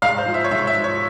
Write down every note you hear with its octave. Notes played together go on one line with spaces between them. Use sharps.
G#2 F5
C5
F3
E5
C#5
G#2 E5
E5
F3
C#5